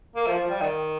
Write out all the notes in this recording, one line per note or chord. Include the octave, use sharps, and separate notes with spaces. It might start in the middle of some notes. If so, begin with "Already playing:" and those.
A#3
F3
F3
G3
D#3